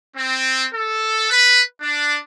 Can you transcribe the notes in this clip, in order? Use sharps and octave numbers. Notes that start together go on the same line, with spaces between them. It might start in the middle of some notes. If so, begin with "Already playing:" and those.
C4
A4
B4
D4